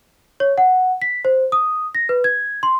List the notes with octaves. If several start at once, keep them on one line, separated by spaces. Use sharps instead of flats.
C#5
F#5
B6
C5
D#6
A#6
B4
G#6
C6